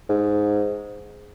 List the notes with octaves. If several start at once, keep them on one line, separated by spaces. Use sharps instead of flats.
G#2